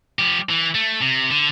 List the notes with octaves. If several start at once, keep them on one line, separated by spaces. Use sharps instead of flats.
F3 G4
E3
A3
C3
D3